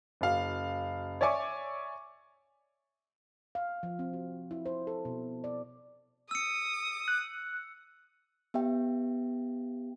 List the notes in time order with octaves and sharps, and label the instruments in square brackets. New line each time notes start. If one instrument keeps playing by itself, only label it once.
[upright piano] F#1 F5
C#5 D5 E5 G#5 C#6 D6
[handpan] F5
F3
C4
F#4
E4
C5
A4
B2
D5
[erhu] D#6 [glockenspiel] E6 C#7
[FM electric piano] F#6
[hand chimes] B3 G4 E5 G5